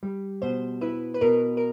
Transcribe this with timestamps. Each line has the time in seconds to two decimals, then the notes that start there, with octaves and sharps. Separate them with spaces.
0.03 G3
0.42 B2 C5
0.81 E4 B4
1.14 B4
1.21 B2 A#4
1.57 A#4